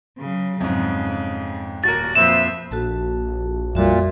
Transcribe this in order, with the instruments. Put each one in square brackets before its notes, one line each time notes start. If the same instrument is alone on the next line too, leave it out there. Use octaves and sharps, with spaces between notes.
[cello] C#3 F#3
[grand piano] F2 G#2 [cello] C#3
[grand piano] D#1 A#4 [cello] F#4 [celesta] A6
[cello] F2 [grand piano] A#2 F3 [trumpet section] B4 C5 E5 [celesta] E7
[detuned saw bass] A#1 [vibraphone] F#4 A4 A5
[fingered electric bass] F2 G3 [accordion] A#2 [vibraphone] F#4 E5